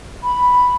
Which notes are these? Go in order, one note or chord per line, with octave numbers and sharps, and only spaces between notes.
B5